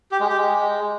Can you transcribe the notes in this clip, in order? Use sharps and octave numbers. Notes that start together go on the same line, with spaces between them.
G4
G#3
G4
G#3